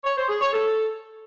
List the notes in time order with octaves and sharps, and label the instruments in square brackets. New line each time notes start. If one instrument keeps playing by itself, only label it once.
[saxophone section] C#5
C5
G#4
C#5
A4